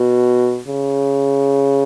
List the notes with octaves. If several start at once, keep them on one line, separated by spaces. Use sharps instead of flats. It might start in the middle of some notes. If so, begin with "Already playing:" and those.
Already playing: B2
C#3